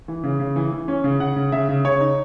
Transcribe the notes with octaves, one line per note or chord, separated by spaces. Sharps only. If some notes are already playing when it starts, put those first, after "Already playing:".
E3
C#3
C#3
E3
E3
C#4
C#3
C#3 F#5
C#3
C#3 E5
C#3
C#3 C#5
D#4